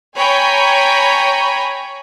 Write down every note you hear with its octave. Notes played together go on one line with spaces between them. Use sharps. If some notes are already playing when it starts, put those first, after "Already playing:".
C#5 G5 G#5 A#5 B5